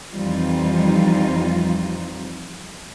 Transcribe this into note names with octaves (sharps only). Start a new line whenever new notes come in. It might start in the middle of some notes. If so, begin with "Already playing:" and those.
F2 E3 G3 C4 D#4 F4